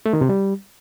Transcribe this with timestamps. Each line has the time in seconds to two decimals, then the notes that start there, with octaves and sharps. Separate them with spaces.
0.06 A3
0.13 D#3
0.21 C3
0.29 G3